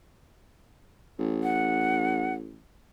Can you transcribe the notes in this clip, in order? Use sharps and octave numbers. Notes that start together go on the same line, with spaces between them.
A1
F#5